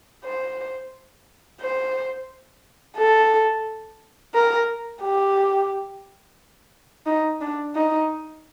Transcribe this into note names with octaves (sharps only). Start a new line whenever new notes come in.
C5
C5
A4
A#4
G4
D#4
D4
D#4